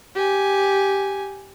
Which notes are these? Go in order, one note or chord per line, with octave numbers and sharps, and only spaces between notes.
G4 G#5